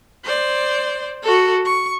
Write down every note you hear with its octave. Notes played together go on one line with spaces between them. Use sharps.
C5 D5
F#4 A4
C#6